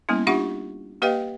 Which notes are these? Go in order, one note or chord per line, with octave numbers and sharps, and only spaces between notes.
G3 A#3 B3 C#4 E4
D4 F4 G4 E5 F#5 C#6
A#3 G4 B4 D#5 F5 G5